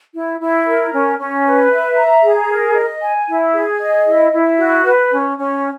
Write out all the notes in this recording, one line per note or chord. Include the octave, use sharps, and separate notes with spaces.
E4
E4
A#4
C#4
C#4
B4
E5
A#5
G#4
A#4
D#5
G#5
E4
G#4
D#5
E4
E4
F#4
B4
C#4
C#4